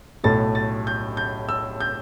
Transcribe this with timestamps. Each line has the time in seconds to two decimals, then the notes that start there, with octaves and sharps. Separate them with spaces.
0.24 B1 A2 A3 A6
0.55 A6
0.87 G6
1.17 G6
1.49 E6
1.80 G6